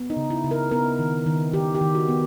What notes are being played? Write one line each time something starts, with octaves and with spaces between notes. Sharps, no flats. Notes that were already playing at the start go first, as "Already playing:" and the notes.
Already playing: B3
D#4
C#3
E4
C#3
A#4
B3 A#4
D#3
D#3
D#3 G4
G4
D#3
F#4
B3